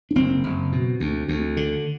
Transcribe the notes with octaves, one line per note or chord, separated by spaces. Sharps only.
D4
F#1 C4
F#1
B2
D2
D2
D3